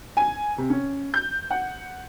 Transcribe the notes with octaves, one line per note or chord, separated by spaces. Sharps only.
G#5
C3
C#4
G6
F#5